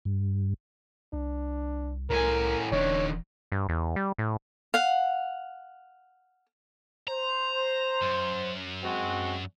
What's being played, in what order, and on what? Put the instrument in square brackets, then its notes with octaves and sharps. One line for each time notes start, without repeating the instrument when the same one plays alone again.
[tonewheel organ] G2
[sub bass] C2 [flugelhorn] D4
[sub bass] C2 [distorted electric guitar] A2 G#5 [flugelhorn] A#4
[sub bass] D#1 [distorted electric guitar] D#3 D4 [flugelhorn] C#5
[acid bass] G2
E2
G3
A2
[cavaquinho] F5 F#5
[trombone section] C5 [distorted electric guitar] A#5
[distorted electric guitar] F#2
[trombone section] G#3 C4 F#4